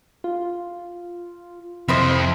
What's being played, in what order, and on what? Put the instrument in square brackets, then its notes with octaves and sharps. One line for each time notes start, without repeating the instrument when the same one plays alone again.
[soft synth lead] F4
[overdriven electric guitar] F2 [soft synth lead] C3 [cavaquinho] E4 C5 D#5